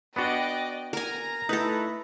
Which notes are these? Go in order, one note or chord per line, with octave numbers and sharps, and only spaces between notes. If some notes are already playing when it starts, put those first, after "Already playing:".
B3 D4 F#4 D5 D#5 G5
A#4 G#5 A#5
A3 D#4 E4 A4 B4